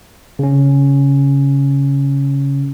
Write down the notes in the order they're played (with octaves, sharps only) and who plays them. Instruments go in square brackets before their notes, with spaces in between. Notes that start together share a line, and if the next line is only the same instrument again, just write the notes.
[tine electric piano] C#3 C#4